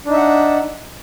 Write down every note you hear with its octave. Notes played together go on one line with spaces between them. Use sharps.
D4 D#4 E5 F#5